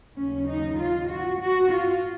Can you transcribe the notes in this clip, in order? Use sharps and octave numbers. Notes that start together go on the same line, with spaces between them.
D#2 C#3 F#3 C#4
D#4
F4
F#4
F#4
F4